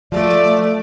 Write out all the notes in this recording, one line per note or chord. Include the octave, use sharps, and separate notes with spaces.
F3 A3 D5